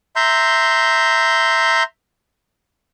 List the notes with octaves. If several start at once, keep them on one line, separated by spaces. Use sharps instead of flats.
E5 A#5 C6 G6